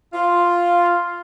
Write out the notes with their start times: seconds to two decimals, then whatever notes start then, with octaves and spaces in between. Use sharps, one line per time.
0.13 F4